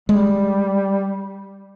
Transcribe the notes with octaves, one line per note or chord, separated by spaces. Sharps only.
G3 G#3